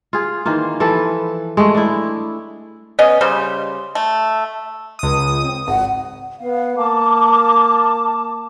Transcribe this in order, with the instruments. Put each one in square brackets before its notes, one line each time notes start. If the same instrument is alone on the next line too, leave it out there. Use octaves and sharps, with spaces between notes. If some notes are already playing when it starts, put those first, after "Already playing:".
[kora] F4 G#4
D#3 E3 A#3 F4
E3 F3 A4 B4
G#3 A3
D4 E4
[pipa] B3 C#4 D#5
C#3 G3 C5
A3
[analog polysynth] C#2 D#6
[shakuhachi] C4
[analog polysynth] G#1 [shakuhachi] F#5
[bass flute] B3 [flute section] F5
[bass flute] A#3 [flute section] A5 D6